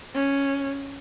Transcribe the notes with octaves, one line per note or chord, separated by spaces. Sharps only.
C#4